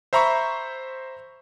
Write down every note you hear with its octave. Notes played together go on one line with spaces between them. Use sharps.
C5 E5 A#5 B5 C#6